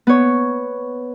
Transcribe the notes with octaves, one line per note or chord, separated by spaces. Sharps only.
B3 C#5